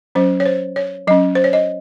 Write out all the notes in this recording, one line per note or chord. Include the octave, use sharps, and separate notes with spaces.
F#3 C#4 C5
C#5
C5
C#5
F#3 C#4 D#5
C5
C#5
D#5